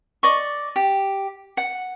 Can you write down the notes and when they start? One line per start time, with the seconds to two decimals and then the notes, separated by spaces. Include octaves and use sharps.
0.23 D5 D#5 C#6
0.76 G4
1.57 F#5